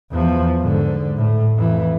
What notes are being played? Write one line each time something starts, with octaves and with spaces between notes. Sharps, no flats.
E2 F3
G#2 D3
A2
F2 E3